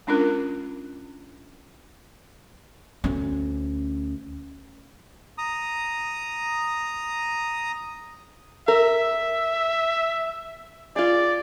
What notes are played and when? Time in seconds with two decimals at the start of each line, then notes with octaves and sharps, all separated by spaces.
0.07 G#3 C#4 D4 F4 A#4
3.04 D2 C#4
5.38 A#5 D#6
8.68 A#4 E5
10.96 F4 G#4 D5